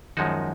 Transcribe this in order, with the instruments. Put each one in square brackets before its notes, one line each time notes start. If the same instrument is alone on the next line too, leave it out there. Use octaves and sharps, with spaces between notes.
[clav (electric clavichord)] F#2 F3 G#3 D#4 F#4 [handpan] D#3